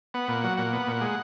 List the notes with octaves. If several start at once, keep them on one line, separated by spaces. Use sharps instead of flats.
B3 F#5
A#2
F#3
A#2 F#5
B3
A#2
G#3